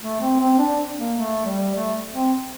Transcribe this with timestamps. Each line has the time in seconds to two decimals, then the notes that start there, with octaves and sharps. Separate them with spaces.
0.02 A3
0.20 C4
0.40 C4
0.59 D4
0.98 A#3
1.17 A3
1.45 G3
1.75 A3
2.13 C4